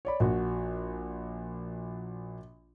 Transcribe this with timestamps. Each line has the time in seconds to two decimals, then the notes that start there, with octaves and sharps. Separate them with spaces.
0.05 C#5 D5 B5
0.20 A#1 F#4